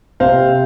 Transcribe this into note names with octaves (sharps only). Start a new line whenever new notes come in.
C3 C5 F5